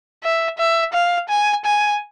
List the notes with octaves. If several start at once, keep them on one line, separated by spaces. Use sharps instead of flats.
E5
E5
F5
G#5
G#5